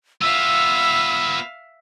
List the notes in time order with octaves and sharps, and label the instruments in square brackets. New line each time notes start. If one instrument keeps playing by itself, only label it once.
[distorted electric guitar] B3 F4 [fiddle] E5 F5 [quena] E6